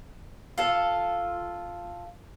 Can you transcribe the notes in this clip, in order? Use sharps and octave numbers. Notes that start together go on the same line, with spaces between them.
F4 A4